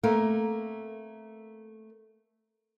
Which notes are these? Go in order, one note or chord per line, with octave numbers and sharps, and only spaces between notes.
A3 A#3 C4 A#4